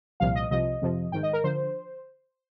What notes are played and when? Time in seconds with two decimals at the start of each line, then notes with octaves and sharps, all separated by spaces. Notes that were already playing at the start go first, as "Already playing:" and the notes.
0.20 C2 A#2 F3 F5
0.35 D#5
0.51 C2 C3 F3 D#5
0.82 F2 C3 F3
1.12 G#1 G#2 D#3 G5
1.23 D#5
1.33 A#4
1.44 D3 F3 C5